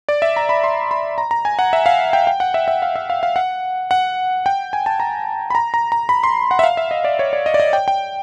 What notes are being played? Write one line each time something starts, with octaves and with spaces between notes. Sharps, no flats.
D5
E5
A#5
B5
C6
B5
A#5
A#5
G#5
F#5
E5
F5
G5
G5
F#5
E5
E5
F5
E5
F5
F5
F#5
F#5
G5
G#5
A5
A#5
B5
A#5
A#5
A#5
B5
C6
F#5
E5
F5
E5
D#5
D5
C#5
D5
D#5
D5
D#5
G5
G5